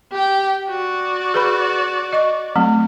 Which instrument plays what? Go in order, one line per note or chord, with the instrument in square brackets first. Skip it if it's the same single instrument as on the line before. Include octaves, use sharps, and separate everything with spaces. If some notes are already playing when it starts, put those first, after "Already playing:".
[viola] G4 G5
F#4 D5
[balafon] G#4 B4 B5
D#5 C#6
F#3 A3 C4